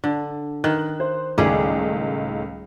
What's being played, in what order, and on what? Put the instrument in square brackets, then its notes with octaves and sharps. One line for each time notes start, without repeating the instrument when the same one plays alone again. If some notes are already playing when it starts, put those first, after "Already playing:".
[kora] D3
[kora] D#3 [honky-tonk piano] F#6
[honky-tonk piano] C5
[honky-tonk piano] C#2 A2 D#3 [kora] G3 G#4